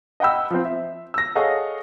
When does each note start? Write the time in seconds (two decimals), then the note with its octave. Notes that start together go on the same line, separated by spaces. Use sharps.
0.20 D#5 F#5 G5 B5 E6
0.51 F3 C4
0.65 E5
1.14 E6 A#6
1.35 G#4 A4 C#5 D#5 F5 F#5